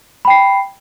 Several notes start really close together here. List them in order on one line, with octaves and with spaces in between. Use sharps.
B5 G5 C7